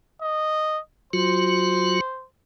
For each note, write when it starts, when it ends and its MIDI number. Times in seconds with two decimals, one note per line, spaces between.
0.22 0.80 75
1.13 2.00 54
1.13 2.00 65
1.13 2.00 66
1.13 2.26 72